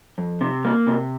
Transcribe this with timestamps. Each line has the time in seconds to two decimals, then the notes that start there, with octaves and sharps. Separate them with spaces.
0.18 F2
0.41 C3
0.65 A#3
0.87 C3